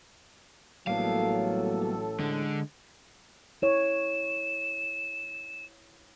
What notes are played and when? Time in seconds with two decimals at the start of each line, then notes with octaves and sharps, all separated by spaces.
0.87 A1 A2 F#3 G3 A#3 B3 A4 F5
2.20 D3 G#3
3.62 E4 C#5 E7